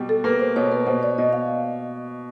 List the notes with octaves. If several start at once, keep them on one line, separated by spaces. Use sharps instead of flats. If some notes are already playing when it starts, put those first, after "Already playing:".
Already playing: B2 G3
A4
A#3 B4
C5
B2 C#5
B4
B2 C5
D5
B2 D#5
F5